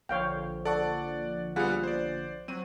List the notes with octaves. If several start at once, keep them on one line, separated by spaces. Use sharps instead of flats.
A#1 D3 F3 C#5 F5 G5
A4 D5 F#5 C#6
G3 B3 F4 G#4 F#5
C5 D5
F#3 C4 D#7